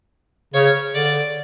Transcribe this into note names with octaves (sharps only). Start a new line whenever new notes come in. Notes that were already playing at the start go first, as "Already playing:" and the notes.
C#3 C#5
D3 D5